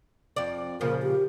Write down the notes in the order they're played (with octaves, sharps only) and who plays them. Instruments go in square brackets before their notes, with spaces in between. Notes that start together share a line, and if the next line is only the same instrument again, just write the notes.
[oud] F2 D5
[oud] A#2 C#3 F3 [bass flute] A#4
[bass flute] G4